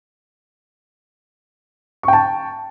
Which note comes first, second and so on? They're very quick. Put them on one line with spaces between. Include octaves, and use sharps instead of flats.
C#6 G5 A5